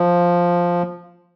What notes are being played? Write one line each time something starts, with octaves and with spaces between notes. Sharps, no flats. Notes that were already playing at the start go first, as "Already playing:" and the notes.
Already playing: F3